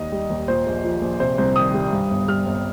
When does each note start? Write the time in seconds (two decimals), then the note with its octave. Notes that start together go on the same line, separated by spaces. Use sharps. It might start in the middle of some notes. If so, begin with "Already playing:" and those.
Already playing: D#2 D#3 D#5
0.12 G3
0.30 D#2
0.48 A#2 C5
0.66 A#1
0.84 F3
1.02 A#1
1.20 C3 C5
1.38 C2 C5
1.56 D#3 D#6
1.74 G3
1.93 G2
2.10 G1
2.28 G3 F6
2.46 G1